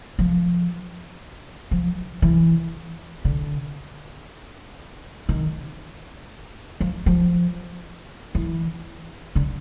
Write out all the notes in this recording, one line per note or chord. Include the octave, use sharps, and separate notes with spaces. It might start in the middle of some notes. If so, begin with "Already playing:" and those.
F3
F3
E3
D3
D#3
F3
F3
E3
D3